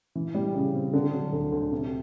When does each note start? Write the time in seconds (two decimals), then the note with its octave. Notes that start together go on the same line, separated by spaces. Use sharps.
0.15 E3
0.34 G3
0.54 C#3
0.74 C4
0.93 D3
1.13 F#3
1.33 D2
1.52 D2
1.72 C3